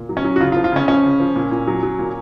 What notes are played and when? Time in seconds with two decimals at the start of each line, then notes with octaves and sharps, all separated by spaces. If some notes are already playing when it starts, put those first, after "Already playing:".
Already playing: A#2
0.09 F#3
0.17 C#4
0.24 F#3
0.36 F#4
0.40 C#3 F4
0.52 F4
0.56 F3
0.64 F4
0.72 C#3 C#4
0.88 F3 C#4
1.04 C#3
1.20 F3
1.36 A#2
1.51 A#2
1.67 F#3
1.83 F#3
1.99 A#2